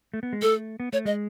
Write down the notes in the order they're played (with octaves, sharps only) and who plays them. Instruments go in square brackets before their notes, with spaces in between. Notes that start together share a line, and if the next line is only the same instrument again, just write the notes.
[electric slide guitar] A3
B3
G#3
[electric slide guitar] A3 [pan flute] A4
[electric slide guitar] B3
[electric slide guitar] A3 [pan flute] C#5
[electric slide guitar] G#3 [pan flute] D#5